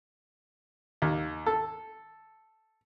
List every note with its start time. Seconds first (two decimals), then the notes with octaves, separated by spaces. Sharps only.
1.02 D#2
1.46 A4